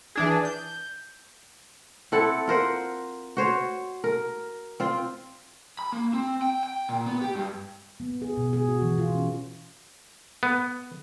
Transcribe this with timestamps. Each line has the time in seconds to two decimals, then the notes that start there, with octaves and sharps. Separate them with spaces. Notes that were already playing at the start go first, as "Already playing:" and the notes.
0.16 E3 D4 G#4
0.45 G6
2.12 C4 E4 A4 F#5
2.48 F4 A#4 C5 F#5
3.37 F#4 C5 C#5
4.04 A#4
4.80 C4 F4
5.79 B5
5.92 A#3
6.13 C4
6.42 G5
6.63 G5
6.89 A#2
7.06 B3
7.21 G4
7.35 G2
8.00 B3
8.22 G#4
8.37 B2
8.53 G#4
8.69 F#4
8.82 E3
8.98 F4
9.15 C#4
10.43 B3